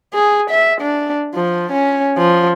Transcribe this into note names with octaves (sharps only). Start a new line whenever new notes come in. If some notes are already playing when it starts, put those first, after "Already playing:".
G#4
E5
D4
F3
C#4
F3